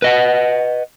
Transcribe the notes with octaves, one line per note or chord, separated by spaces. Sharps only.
B4 D#5 F#5